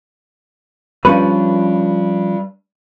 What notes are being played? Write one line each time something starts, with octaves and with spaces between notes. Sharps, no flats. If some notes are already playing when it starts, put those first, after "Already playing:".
F3 G3 C#4 D4 B4